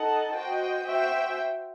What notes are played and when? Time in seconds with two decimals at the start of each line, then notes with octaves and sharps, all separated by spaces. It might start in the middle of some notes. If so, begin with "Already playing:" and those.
Already playing: D#4 A4 D#5 F#5 A5
0.35 F#4 C5 D#5 G5
0.87 F#4 C5 E5 G5